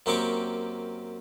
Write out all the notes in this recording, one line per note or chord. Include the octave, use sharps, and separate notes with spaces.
F#2 A#3 C4 G4 C#6 D6